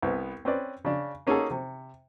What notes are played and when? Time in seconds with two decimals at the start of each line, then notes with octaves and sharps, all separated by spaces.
0.02 C2 B3
0.45 C4 C#4 B4 D5
0.85 C#3 D4
1.27 A#3 C#4 D#4 F#4 G#4 A4
1.50 C3